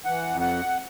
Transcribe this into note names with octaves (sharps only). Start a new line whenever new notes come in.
E3 F#5
F2
F#5